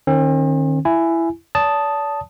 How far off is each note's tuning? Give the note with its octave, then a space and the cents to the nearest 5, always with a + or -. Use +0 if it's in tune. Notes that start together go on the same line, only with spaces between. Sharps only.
D#3 -25 C4 +45
E4 +15 G#5 +0
D5 -45 A5 +0 D#6 +0